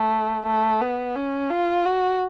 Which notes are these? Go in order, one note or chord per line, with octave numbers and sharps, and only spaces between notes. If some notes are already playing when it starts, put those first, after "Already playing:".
Already playing: A3
A3
B3
C#4
F4
F#4